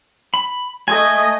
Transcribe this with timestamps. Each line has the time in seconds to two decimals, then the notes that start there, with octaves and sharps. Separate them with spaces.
0.34 B5
0.88 A3 D#5 G#5